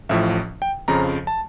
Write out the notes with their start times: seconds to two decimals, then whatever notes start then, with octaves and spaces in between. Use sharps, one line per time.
0.09 A1 A2 F3 E5
0.62 G5
0.88 F2 C#3 F3 A#5
1.27 A5